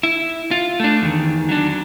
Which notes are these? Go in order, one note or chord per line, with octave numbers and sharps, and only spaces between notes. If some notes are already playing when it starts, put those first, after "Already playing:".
E4
F4
A3 D4
E2 D#3
F#3 D4